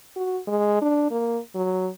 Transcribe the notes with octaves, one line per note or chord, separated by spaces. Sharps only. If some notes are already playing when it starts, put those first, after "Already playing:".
F#4
G#3
D4
A#3
F#3